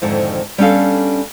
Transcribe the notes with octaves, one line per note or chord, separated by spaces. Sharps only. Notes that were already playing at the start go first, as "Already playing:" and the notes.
F2 G#2 D3 D#3
G3 B3 C#4 D4 A4 F5